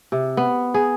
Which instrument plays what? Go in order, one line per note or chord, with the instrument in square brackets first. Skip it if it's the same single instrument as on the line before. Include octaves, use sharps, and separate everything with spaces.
[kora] C3
B3
G#4